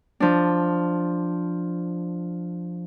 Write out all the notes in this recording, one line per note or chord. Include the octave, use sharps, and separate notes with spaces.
F3 D4